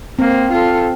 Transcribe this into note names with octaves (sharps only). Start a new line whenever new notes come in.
A#3 C4
F4 A4